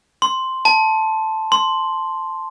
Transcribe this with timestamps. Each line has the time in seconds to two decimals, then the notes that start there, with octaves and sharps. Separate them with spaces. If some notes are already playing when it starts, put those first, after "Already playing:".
0.22 C6
0.65 A5
1.52 C6